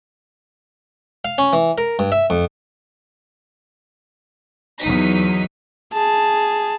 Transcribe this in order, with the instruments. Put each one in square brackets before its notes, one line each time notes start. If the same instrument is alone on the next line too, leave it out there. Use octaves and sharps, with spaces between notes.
[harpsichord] F5
C#4
E3
A#4
G2
E5
F2
[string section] E2 F#3 D#4 B6
[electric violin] G#4 A5